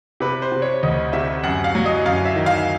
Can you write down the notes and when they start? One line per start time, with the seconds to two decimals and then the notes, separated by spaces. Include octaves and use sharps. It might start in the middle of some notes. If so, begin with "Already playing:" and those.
0.20 C3 B4
0.42 C5
0.52 C3
0.62 C#5
0.83 D2 D#5
1.13 C3 E5
1.43 F#2 F#5
1.64 F5
1.75 F#3
1.85 D#5
2.05 F#2 F5
2.25 E5
2.36 D#3
2.46 F5